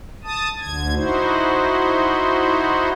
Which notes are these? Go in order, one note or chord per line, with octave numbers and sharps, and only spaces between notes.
A5 D#6
D2 D3 G#6
D#4 E4 F#4 C5